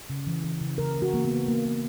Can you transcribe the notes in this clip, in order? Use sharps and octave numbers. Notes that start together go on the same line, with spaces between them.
C#3
E3
E3
C#3
C#3 A#4
E3
F#4
E3 A#3
B3
C#3
A#3
A#3